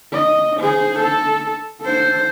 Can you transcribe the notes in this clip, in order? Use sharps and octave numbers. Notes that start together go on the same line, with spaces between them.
D#5
G#4 C5
A4
A4 C5